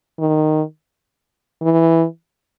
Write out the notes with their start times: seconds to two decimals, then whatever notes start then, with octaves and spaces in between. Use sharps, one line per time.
0.19 D#3
1.62 E3